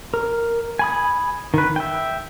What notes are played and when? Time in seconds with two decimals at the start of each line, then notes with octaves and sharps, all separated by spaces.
0.14 A#4
0.79 G#5 B5 D#6
1.54 D#3 B4
1.76 E5 G5